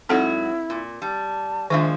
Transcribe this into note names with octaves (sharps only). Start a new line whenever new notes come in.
G#2 F#3 C4 E4 F#4 A4 F#5
A#2
G3 A5
A#2 D#3 F3 G#3 D4 E5